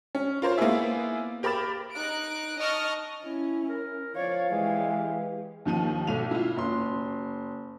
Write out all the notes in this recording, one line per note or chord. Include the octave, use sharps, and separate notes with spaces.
C#4
F4 A#4 C5 C#5
A#3 B3 D#4 E4 G#4 E5
G4 A#4 B5 D6 A6 E7
D#4 F#6 D7
D#5 A5 C#6 D#6 F6
C#4 E4
A#4
F3 C#5 D5 F5
E3 G#3 G4
D#2 D#3 F3 D#7
B1 A3 D#7 F7
E4 F4
F#1 C6